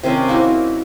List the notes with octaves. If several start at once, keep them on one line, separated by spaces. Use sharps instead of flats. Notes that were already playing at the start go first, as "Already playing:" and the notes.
C3 D#3 C4 C#4
A#3 D#4 E4 F#4